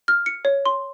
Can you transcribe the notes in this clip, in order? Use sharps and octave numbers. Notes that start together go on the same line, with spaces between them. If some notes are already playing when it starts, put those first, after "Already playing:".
F6
C#7
C#5
C6